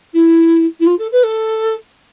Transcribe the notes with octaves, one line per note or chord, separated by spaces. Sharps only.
E4
E4
F4
A4
B4
A4